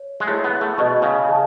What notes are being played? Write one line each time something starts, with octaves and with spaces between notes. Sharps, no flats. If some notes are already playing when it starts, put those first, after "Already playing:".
Already playing: C#5
G#3
A3 E4 G#4 C#5
B3
A3
B2 G#4 D#5 A5 C#6
C#3
G#4 D#5 A5